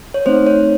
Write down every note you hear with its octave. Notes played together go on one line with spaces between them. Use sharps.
C#5
A3 C4 D#4 C5
C#5